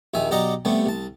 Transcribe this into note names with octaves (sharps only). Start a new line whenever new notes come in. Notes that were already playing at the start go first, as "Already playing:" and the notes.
A#1 D#2 D#3 E5 G#5
B1 G4 D5 D#5 F#5 A#5
C3 G3 A3 B3
C2 A5